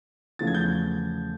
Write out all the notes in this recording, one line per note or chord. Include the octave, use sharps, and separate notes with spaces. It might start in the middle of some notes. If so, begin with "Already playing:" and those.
E2 C#3 F3 A3 A6
G#6
G6 A6